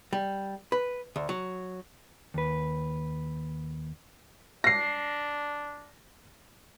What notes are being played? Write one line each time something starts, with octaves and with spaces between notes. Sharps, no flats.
G3
B4
D2
F#3
D#2 B4
D4 A#6 C7